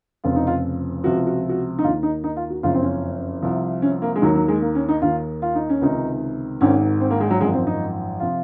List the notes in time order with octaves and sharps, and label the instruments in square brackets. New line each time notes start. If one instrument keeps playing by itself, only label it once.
[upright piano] F1 F2 C#3 F3 F4
D#4
F4
C#2 C3 F3 F#4
F#4
F#4
D#4
D#2 F4
D#3
D#4
D#4
F4
F#4
F#1 F2 C#3 F4
C4
C#4
C2 C3 F3
C#4
A#3
G#3
D#2 D#3 F#3
F#3
G#3
A#3
C#4
D#4
D#2 D#3 F4
F4
D#4
C#4
C#2 C3 D#3 D#4
G#1 G#2 D#3 C#4
C4
A#3
G#3
F#3
G#1 F#2 F3 G#3
C4
D#4
C3 F3 F4